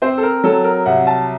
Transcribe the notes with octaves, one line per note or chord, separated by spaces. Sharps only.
C4 C5
A4
A#4
F#3 A4
A#4
C2 F#5
A5